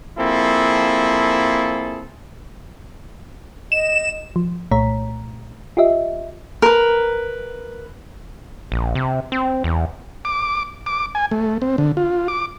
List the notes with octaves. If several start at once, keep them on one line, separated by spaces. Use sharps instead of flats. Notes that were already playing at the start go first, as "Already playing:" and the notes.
F3 A#3 C4 E4 G#4 A4
D#5 E7
F3
C2 A#2 A3 C#5 A#5 B6
F4 G4 D#5 E5
A#4 B4
A#1
C3
C4
E2
D6
D6
G#5
A3
C4
D3
F4
D6